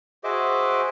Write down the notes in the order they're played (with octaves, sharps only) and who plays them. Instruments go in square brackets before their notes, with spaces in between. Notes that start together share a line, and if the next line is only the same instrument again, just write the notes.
[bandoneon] F#4 G#4 C5 D#5 E5 D6